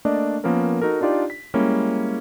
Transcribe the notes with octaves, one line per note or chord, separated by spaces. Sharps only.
A3 A#3 D4 D5 D#5
F3 A#3 B3 C#4 A#4
D#4 F#4 A4 A#4
D4 D#4 F4 G4 D5
B6
G3 G#3 A#3 C#4 E4